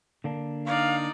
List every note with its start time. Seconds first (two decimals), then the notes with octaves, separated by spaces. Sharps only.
0.24 D3 A#3 D4
0.66 D#4 D5 F5